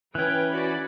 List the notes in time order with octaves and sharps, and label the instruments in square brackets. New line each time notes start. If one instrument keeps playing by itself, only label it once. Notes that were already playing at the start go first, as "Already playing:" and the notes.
[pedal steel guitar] E3 C#4 [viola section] B4 G5 [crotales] F#6 G#6
[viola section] F#4 D5 B5